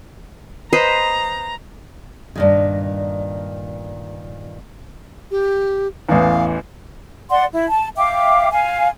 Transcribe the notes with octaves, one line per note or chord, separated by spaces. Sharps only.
B4 C5 D#5 A#5
G2 A#2 D#3
G4
A1 E2 F5
D5 F#5 C6
E4
A5
E5 F5 G5 D6
F5 G#5